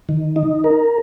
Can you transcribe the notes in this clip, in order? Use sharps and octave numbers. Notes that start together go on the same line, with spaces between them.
D#3
D#4
A#4